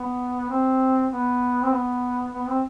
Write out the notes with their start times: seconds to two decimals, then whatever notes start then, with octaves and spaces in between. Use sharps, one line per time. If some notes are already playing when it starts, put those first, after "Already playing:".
Already playing: B3
0.50 C4
1.11 B3
1.63 C4
1.72 B3
2.33 B3
2.47 C4